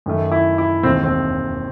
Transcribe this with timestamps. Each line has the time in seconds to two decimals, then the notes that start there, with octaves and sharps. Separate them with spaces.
0.06 F#2 D#3 A3
0.32 E4
0.58 E4
0.83 E1 D#2 D#3 C4
1.03 C4